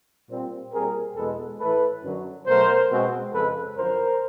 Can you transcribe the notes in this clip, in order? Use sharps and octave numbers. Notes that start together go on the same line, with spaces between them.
A#2 G3 C4
A#2 G3 C4 G#4 A#4
E2 B2 G#3 B3 A4 B4
A2 E3 A3 A4 B4
F#2 D3 F#3
B2 F#3 A3 A#4 C5
B2 G#3 C4
F2 C#3 F3 G#3 A4 B4
F#2 D3 F3 A#4 C5